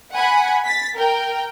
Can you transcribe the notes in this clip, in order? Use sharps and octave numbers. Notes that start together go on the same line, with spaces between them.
F#5 G#5 B5
A6 B6
A#4 G5